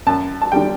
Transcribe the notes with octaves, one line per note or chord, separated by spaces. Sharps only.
F#2 A5
A5
D3 G3 G5